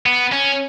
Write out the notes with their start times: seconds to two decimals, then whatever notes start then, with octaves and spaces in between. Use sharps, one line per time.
0.06 B3
0.32 C#4